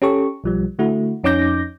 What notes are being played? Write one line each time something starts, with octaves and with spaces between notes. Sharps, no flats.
C#4 G4 A4 C#6
B1 F3 G3
D3 A3 E4 F#4
F2 C#4 D#4 D6 G6 A#6